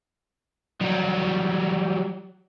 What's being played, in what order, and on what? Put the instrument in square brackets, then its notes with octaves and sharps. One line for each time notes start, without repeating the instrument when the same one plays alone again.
[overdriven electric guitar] F#3 G3